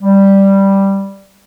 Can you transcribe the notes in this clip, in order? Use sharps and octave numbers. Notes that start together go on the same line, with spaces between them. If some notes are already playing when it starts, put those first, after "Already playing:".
G3